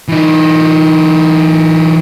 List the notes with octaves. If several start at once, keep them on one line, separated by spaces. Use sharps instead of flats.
E3 D#4